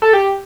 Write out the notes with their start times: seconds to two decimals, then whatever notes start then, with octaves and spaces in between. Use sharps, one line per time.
0.02 A4
0.13 G4